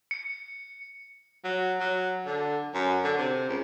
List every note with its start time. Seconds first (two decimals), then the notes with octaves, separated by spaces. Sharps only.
0.11 C#7
1.44 F#3
1.80 F#3
2.26 D3
2.74 F#2
3.04 D3
3.18 C3
3.49 C#2